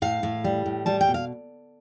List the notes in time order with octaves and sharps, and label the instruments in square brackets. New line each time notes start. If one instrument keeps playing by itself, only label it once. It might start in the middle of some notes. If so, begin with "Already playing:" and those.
[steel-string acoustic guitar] A2 F5
A2
G3
A2
G3 A5
G5
B2
F5